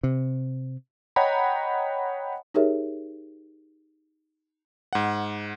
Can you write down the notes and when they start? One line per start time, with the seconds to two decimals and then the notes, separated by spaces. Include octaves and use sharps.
0.03 C3
1.16 C#5 D#5 F#5 G5 A#5 B5
2.54 D#4 G4 G#4 A#4 C#5 E5
4.93 G#2 F#5